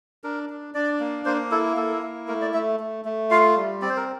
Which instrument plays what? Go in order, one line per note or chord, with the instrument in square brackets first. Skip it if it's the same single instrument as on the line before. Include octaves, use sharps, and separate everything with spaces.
[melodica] D4 A#4
D4
D4 D5
A#3
A#3 C5
E4 A4
A#3 A4
E4
A3 A#4
D5
A3 E5
A3
A3
F4 F5
G3
C4 D5
C5
A#4